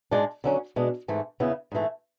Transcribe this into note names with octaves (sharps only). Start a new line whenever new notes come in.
G#2 G#3 D4
D3 F#3 C#4
B2 G#3 D4
G#2 E3 A3
E2 C#3 E3 B3 E4
G#2 E3 A3